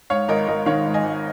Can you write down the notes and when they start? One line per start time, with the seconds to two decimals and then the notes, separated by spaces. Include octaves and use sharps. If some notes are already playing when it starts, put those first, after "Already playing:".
0.10 G#2 C#5 F5
0.28 G#1 A#4 D#5
0.47 G#1 A#4 D#5
0.66 D#3 C#5 F5
0.85 G#2
0.94 D#5 G#5
1.03 G#1